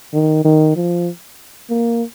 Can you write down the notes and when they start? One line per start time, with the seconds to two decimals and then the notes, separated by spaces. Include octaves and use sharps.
0.13 D#3
0.44 D#3
0.76 F3
1.70 A#3